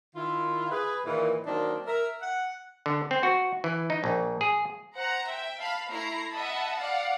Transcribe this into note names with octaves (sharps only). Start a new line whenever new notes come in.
D#3 E4 F4
G#4 B4
A#2 D#3 E3
D#3 F#3 A#3 C4 D4 D#4
A#4 E5
F#5
D3
C4
F#4
E3
D#4
A#1
G#4
C5 F#5 A#5
E5 G5
F5 A5 B5
A3 E4 A#5 C7
D#5 E5 F#5 A5 B5
D5 F5 F#5